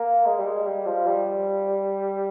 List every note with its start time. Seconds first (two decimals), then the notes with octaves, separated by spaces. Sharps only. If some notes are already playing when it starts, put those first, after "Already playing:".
Already playing: A#3
0.26 G#3
0.39 G3
0.46 G#3
0.66 G3
0.86 F3
1.07 G3